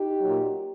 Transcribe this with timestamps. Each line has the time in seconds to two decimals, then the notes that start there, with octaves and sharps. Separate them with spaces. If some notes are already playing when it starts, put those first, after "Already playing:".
Already playing: D#4 G4
0.21 A#2 F#3